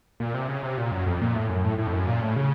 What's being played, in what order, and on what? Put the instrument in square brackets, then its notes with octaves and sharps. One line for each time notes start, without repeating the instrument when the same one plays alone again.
[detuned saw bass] A#2
C3
C#3
C3
A#2
F#2
F2
A#2
A2
F#2
A2
A2
F2
F#2
A#2
A2
C#3